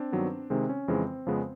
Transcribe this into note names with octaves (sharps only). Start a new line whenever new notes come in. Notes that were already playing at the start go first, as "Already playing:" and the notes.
Already playing: C4 D4
G2 D#3 F#3 B3
C3 D#3 G#3 C4
C#4
F2 C#3 E3 G#3 C4
F2 C#3 F3 G#3 B3